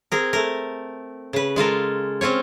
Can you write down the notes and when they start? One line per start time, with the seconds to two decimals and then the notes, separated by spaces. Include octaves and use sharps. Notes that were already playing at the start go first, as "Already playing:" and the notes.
0.12 C4 G#4 A#4
0.33 A3 A#4
1.33 C#3 B4
1.56 G#3 F4 A4 A#4
2.21 C4 C#4 F4 C#5